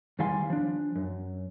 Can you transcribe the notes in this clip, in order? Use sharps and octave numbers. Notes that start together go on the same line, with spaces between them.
E2 D#3 G3 F5 G#5 C6
F3 D4
F#2